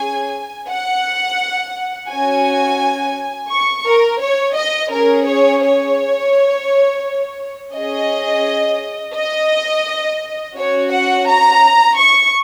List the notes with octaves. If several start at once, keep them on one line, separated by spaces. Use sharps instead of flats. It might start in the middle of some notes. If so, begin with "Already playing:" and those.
Already playing: C#4 G#4 G#5
F#5
C#4 F#4 G#5
C#6
A#4
C#5
D#5
C#4 G#4 A#4
C#5
C#5
C#4 G#4 D#5
D#5
C#4 F#4 C#5
F#5
A#5
C#6